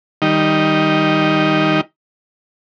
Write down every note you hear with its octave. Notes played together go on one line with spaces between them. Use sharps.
D#3 G3 D#4